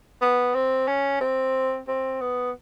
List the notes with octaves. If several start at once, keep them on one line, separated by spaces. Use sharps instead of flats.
B3
C4
C#4
C4
C4
B3